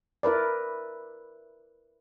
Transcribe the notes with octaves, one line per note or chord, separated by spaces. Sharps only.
E4 A#4 B4 D5